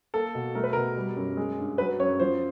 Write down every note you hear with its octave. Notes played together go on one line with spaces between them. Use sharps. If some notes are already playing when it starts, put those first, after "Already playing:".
A#3 A4
B2
A3 A#4
B4
B2 A#4
G3
F#2
G#3
G2
F#3 B4
F#2 C#5
F3 C5